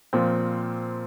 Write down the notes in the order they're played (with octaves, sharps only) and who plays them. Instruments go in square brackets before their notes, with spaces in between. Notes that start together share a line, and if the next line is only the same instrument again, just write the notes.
[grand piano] A#2 F3 C4 F4